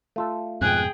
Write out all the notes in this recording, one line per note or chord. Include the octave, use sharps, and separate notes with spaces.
A3 F4 A4
F2 G#2 B2 G#4 G5 F#6